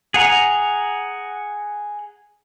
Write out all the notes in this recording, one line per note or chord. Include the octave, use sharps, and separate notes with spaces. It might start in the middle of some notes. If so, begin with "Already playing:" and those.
G#4 F#5 A#5